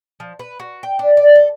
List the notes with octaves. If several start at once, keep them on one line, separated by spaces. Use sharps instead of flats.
F3
B4
F#4
G5
D4
D5
A4